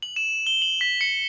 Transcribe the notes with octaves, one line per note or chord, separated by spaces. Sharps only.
F#7
E7
G7
F#7
B6
C#7